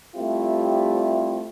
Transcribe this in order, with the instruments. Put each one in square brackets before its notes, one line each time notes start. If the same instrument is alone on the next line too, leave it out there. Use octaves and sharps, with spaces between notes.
[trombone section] G3 A3 C4 E4 F4 G4